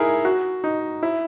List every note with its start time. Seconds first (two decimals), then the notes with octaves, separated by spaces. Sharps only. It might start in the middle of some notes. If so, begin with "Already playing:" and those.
Already playing: D#4 E4 G#4 A#4
0.25 F#4
0.64 D#4
1.03 E4